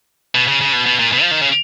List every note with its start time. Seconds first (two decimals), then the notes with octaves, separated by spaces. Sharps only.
0.35 B2
0.48 C#3
0.61 C#3
0.73 B2
0.86 B2
1.00 A#2
1.12 B2
1.22 F3
1.31 D#3
1.41 C#3